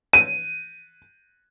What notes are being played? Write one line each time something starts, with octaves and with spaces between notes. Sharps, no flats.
D#7